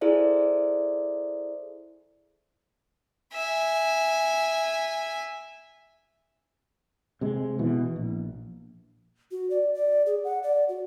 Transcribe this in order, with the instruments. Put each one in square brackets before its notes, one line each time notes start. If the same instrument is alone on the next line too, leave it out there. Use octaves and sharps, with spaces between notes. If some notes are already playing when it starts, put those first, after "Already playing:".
[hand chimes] E4 G#4 A4 C5 D5 E5
[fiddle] E5 G#5
[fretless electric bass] C3 G#3
B2 E3
A#1
[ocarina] F#4
D5
D5
G#4
F#5
D5
F#4